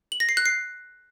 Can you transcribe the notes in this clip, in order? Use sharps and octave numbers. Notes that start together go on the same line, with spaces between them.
F#7
A#6
C7
F#6
C7